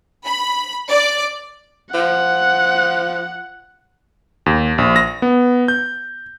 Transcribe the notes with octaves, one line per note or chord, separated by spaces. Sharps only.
B5
D5
F3 F#5
D#2
A#1
A#6
B3
G6